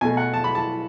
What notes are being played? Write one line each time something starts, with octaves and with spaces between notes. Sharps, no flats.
B2 A3 G#5
F#5
A5
B5
A5